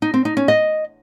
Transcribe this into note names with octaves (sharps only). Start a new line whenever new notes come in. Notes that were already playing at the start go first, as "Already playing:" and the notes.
D#4
C4
D#4
C#4
D#5